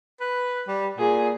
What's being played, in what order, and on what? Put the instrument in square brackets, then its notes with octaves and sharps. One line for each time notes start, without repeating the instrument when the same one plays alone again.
[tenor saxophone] B4
G3
[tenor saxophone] A#2 [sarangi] G#4